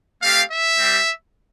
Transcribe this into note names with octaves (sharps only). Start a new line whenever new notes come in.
A3 C4 G4 F5
E5
G3 C4 G4